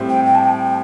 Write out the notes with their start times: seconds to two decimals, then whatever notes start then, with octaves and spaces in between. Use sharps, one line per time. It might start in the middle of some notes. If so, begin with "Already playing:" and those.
Already playing: A2 G3 C4 G4
0.09 G5
0.26 G5
0.35 A5
0.42 G5
0.64 G5